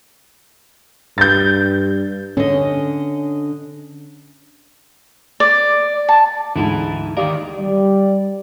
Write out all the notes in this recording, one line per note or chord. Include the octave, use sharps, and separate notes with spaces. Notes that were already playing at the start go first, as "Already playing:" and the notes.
G2 G6 A6
D3 C#4 D#5
D5
A5
D2 G#2 E3 D#4 E4
D#2 D#3 G4 A#4 D5 F5
G3 D5